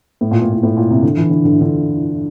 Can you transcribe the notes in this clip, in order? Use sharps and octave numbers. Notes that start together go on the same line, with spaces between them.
A2
A#2
A2
A#2
A2
A#2
C3
D3
E3
D3
D3
E3
D3